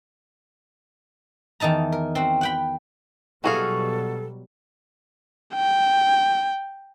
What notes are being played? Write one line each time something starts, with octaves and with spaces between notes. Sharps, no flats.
E2 D#3 D#4 A5 A#5
A#4
C4 F#4
F#5 G5 B5
B2 E3 F#3 G3 F#4 G#4 A4 F5
G5